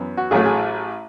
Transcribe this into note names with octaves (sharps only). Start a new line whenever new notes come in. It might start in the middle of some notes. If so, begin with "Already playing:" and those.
Already playing: F#2 E3 B3
F#4
A1 A2 F#3 A3 G#4
G#4